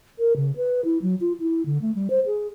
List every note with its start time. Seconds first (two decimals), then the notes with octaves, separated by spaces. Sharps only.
0.19 A#4
0.36 C#3
0.57 B4
0.85 E4
1.02 F#3
1.21 F4
1.40 E4
1.66 D3
1.82 A3
1.95 G3
2.10 C5
2.26 G#4